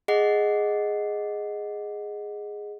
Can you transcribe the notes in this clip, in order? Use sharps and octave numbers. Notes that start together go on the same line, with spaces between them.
G#4 D#5 F#5 C7